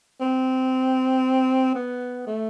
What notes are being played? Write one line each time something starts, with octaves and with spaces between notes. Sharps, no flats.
C4
B3
A3